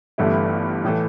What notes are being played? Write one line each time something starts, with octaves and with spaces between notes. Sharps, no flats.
G1 G2 E3 A3 E4
A2 E3 A3